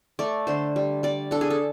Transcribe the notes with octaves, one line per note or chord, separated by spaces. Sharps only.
A3 D5
D3 C5
G3
G3 D5
D4 A4
G#4
A4